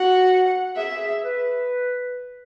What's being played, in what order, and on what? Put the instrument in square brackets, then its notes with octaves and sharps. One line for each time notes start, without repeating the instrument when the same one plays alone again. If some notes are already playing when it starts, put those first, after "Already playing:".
Already playing: [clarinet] F#4 [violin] F#5
[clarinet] G#4 [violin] E5
[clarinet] B4